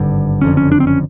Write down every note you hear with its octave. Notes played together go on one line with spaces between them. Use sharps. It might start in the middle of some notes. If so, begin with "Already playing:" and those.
Already playing: G#1 G2 D3
F#1 F2 D3 C#4
C#4
D4
C4
C#4